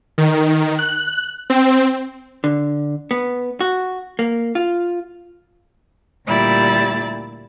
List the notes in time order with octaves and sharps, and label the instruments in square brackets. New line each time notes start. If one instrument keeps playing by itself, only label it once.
[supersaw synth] D#3
F#6
C4
[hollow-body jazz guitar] D3
B3
F#4
A#3
F4
[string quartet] D2 A#2 G3 E4 D5 A6